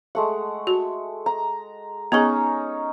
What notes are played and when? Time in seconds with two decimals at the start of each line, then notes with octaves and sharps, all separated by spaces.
0.15 G#3 A3 F#5
0.67 F#4
1.26 A#5
2.12 B3 C#4 D#4 G#4 A#5